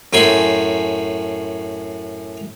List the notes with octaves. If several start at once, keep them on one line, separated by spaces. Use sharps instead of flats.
F#2 A2 G5 G#5 B5 C6